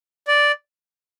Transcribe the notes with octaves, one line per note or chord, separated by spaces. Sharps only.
D5